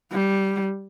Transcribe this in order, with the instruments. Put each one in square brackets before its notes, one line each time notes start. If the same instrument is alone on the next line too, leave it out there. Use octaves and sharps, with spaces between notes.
[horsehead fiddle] G3